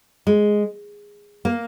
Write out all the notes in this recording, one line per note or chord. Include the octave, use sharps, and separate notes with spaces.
G#3
A#3